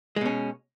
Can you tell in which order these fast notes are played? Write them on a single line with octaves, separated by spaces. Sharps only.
G#3 B2 C#4